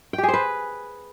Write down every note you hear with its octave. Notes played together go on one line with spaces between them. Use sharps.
G5
G4
G#4
C5
B4